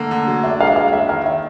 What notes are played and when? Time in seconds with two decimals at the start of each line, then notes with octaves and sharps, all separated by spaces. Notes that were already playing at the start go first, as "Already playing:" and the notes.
Already playing: D3 A3 A#3
0.11 D3
0.27 F#3
0.43 D4 E5
0.60 G#3 F5
0.69 E5
0.76 G#3 F5
0.93 G#3 E5
1.09 D#3 F5
1.26 D#3 E5